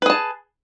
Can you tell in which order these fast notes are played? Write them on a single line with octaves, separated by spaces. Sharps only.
B4 G#4 A5